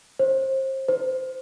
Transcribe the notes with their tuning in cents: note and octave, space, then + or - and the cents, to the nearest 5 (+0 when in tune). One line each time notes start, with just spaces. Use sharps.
C5 +30
C5 -15